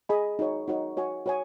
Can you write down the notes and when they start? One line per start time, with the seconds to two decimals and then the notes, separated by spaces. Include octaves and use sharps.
0.09 G#4 D#5 G#5 B5
0.39 D#4 F#4 C#5
0.68 D#4 F#4 C#5
0.97 F#4 C#5 G#5
1.26 F#4 C#5 G#5